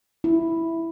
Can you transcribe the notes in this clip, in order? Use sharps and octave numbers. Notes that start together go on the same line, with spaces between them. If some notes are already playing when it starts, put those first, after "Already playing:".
E4